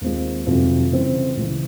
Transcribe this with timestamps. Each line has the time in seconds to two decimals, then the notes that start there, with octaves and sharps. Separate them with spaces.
0.01 D#2 D#3 G#3 C4 F4
0.47 F2 C3 D#3 F#3
0.92 C#3 E3 G3 C4
1.37 C#2 C#3 E3